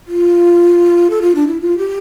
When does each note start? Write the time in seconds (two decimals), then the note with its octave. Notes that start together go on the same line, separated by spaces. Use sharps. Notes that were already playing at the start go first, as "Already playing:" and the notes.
0.07 F4
1.10 A4
1.22 F4
1.35 D4
1.47 E4
1.60 F4
1.78 G4